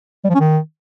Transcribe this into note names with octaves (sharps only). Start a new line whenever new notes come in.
G3
F3
C#4
D#3